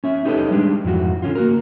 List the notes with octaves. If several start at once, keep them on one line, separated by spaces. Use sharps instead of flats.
C#4 E5
D#4 G4 A4 B4 C#5 D#5
G3 G#3 D4 G4
F2 G#2 E3 F#4
D3 C#4 F4
A#3 F#4 A#4